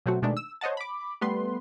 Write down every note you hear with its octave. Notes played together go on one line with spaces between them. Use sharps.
B2 F#3 A3 C4 F#4
B2 D#3 G#3 A3 D4
E6
C5 C#5 D#5 F#5 A5
B5 D6
G3 A3 B3 B4 C6